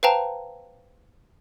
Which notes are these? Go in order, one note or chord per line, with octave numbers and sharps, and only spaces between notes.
B4 C5 F5 G5 A5 A#5